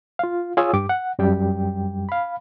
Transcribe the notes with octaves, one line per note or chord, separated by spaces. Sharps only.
F4 F5
F4 G#4 C#5 G#5 D#6 E6
G2 G4 D6
F#5
F#2 G3 G4 G5
F5 B5